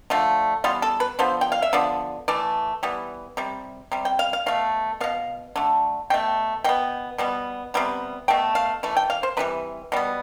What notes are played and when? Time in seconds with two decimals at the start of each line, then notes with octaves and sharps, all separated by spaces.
0.10 D3 F3 A3
0.64 E3 G3 B3 F4
0.82 A4
1.00 B4
1.19 D3 F3 B3 C5
1.41 G5
1.52 F5
1.62 E5
1.73 D3 F3 B3 D5
2.28 E3 A3 D5
2.83 E3 G3 B3
3.37 C3 G3
3.92 C3 G3
4.05 G5
4.19 F5
4.33 F5
4.46 B2 A3 F5
5.01 B2 B3 F5
5.56 D3 A3
6.10 B2 A3 G5
6.64 B2 B3 G5
7.18 B2 G3 B3
7.74 C3 G3 B3
8.28 B2 A3 G5
8.55 F5
8.83 E3 A3
8.97 G5
9.10 F5
9.23 C5
9.37 C3 E3 G3 B4
9.92 B2 G3 B3